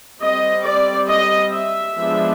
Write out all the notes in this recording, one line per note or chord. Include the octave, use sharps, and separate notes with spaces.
G3 C4 D#5
D5
D#5
E5
F3 G#3 B3 D4